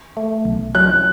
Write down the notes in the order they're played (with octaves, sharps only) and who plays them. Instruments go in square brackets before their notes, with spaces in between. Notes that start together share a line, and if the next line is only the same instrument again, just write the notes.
[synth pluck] A3
B1
[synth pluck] F#3 [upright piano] F#6